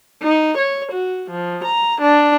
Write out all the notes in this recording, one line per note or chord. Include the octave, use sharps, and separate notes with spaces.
D#4
C#5
F#4
F3
A#5
D4